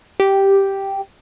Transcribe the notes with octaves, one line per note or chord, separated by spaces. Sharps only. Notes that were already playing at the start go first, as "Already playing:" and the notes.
G4